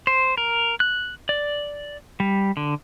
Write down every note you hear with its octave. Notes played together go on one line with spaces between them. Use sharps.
C5
A#4
F#6
D5
G3
D3